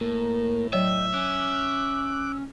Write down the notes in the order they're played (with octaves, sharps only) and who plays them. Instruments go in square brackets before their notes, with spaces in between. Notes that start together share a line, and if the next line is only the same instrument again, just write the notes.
[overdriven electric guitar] A2 [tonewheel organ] A#3 A#4
[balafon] F#3 C#5 [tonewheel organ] D#5 G5 [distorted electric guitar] E5
[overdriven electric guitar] C#4 [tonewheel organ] D6 F#6